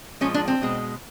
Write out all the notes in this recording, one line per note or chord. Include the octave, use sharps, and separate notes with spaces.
A#2 F3 G#3 C#4
D4
C4
B2 G#3